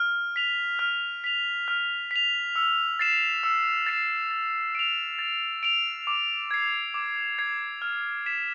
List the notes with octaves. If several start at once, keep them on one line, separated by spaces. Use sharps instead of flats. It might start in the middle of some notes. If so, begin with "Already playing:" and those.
Already playing: F6
B6 F7
F6
B6 F7
F6
B6 F7
E6
A6 C7 E7
E6
A6 C7 E7
A6
D7 F7
A6
D7 F7
D6
G#6 C7
D6
G#6 C7
F6
B6 E7